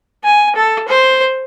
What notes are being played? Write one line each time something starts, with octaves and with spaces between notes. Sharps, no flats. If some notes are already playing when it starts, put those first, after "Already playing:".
G#5
A4
C5